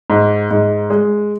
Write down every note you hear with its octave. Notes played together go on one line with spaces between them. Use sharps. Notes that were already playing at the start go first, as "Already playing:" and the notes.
G#2
G#2
G#3